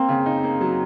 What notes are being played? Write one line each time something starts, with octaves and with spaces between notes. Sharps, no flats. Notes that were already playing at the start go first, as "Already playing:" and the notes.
Already playing: A#3 C4
C#3
D#4
A#3
F#3